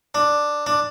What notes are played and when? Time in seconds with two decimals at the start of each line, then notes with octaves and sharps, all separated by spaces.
0.15 D4
0.66 D4